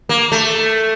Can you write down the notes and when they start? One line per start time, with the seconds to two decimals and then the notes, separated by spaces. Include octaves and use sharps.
0.09 A#3
0.32 A3